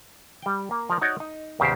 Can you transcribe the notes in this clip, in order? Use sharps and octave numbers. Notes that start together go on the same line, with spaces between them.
G3 G5
A#3
F3 A#4 D5
D#4 F#4 C#5 D5
D#4
E2 A#2 C#3 G4 C5